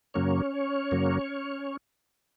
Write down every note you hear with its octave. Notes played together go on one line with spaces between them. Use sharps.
F#2 C#3 F#3 A#3 C#4 C#5
F#2 C#3 F#3 A#3